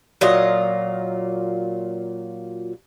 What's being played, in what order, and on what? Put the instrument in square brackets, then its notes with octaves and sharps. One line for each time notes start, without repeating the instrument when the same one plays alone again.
[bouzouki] A#2 F#3 F4 D#5